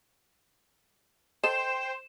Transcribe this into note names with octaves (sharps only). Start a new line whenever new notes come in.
A4 C5 D#5 G5 E7